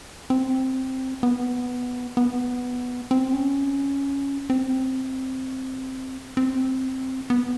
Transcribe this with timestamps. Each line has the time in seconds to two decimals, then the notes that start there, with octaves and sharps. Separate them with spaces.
0.30 C4
1.23 B3
2.17 B3
3.11 C4
3.33 C#4
4.50 C4
6.37 C4
7.30 B3